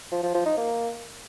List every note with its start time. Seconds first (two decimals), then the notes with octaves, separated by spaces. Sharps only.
0.12 F3
0.23 F3
0.34 F3
0.46 D#4
0.57 A#3